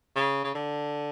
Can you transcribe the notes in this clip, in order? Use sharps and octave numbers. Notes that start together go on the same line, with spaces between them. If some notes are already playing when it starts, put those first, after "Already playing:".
C#3
C#3
D3